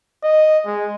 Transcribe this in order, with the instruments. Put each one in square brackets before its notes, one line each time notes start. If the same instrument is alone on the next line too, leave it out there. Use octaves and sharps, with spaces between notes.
[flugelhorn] D#5
G#3